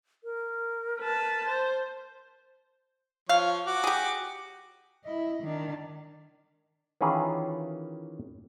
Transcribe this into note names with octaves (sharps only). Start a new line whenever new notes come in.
A#4
B4 A5
C5
F3 C#5 F5
F#4 D6
G4 G#4
E4 D#5
D#3 D4
D#3 E3 C#4 F4 G#4